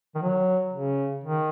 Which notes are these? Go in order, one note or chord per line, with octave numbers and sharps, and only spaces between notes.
D#3
F#3
C#3
D#3